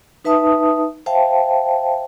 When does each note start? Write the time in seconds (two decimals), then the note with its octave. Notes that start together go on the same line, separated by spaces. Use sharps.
0.25 D#4 B4 E5 A5 D#6
1.06 C5 E5 F5 G5 A5